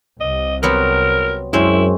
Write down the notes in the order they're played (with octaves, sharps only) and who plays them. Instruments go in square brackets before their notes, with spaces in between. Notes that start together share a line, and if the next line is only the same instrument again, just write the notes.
[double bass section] C2 C3 [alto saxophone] D#5
[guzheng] F#3 B3 C4 [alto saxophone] A#4
[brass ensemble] F#2 [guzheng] G#3 C4 C#4 [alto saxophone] E4